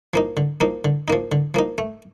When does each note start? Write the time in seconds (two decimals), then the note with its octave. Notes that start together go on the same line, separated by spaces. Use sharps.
0.14 F3 A#3 D#4
0.37 D3
0.60 F3 A#3 D#4
0.85 D3
1.08 F3 A#3 D#4
1.32 D3
1.54 F3 A#3 D#4
1.78 A3